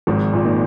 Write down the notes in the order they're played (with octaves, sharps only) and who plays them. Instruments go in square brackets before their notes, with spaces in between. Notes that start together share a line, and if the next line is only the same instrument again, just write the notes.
[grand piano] G#1 G#2 [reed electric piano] F3
[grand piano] A#2
[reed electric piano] A#3 D#4